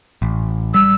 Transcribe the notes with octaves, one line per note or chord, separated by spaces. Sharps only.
A1
G3 E6